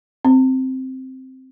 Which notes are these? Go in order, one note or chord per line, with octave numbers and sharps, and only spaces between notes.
C4